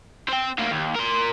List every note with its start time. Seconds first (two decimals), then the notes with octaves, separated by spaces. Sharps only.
0.29 C4 G5
0.58 D2 A#3
0.71 D#2
0.95 A#4 C6